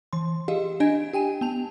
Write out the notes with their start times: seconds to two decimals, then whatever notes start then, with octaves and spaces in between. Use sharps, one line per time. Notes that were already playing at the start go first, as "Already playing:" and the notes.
0.13 E3 C6
0.48 G4 G#4 D#5 F5
0.80 D4 D#5 G#5 G#6 D7
1.13 G4 G5 G#5 D#7
1.41 B3 A5 F7